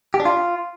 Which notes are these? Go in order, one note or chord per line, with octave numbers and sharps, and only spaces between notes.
G4
D4
F4